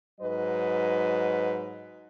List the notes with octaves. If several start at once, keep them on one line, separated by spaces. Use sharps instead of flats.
G#2 F#3 B4 D#5